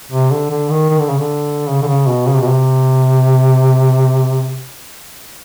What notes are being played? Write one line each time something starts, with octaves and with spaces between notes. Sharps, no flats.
C3
D3
D3
D#3
D#3
D3
C#3
D3
C#3
D3
C#3
B2
C#3
C3
B2
C3